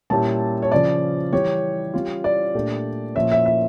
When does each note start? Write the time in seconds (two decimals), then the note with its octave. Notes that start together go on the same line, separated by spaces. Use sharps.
0.10 A#2 G3 C#4 E4 G4 A5
0.62 C#5
0.71 C#3 F3 C#4 F4 D5
1.32 E3 G3 C#4 E4 G4 C#5
1.94 G3 C#4 F4
2.24 D5
2.55 A#2 A3 D4 G4
3.15 A#2 F3 A#3 C#4 E5
3.32 E5
3.46 E5